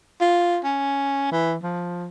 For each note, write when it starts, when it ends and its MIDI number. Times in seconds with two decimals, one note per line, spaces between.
0.21 0.59 65
0.64 1.28 61
1.31 1.56 52
1.63 2.07 53